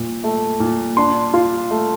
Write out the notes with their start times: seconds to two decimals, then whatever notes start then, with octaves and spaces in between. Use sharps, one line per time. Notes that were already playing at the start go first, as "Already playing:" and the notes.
Already playing: A#2
0.24 A3
0.60 A#2
0.97 D4 C6
1.34 F4
1.70 A3